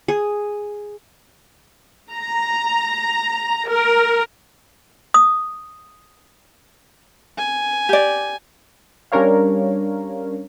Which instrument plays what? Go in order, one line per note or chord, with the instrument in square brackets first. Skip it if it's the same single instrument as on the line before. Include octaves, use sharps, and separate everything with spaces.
[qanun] G#4
[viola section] A#5
A#4
[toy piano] D#6
[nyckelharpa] G#5
[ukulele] G4 D5
[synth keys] G3 C#4 D4 A#4 C#5 F5